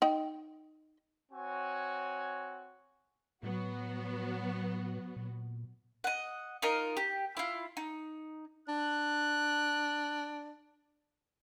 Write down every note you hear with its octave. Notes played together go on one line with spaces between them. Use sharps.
D#4 G5
C4 F#4 C#5 G#5
A2 F#3 B3 F#4
A#2
D#5 F#5
D#4 F4 A#4 D#5
G4
E4 F4
D#4
D4 F#6